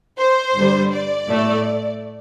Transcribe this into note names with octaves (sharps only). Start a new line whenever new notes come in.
C5
G2 D3 G3
D5
A2 A3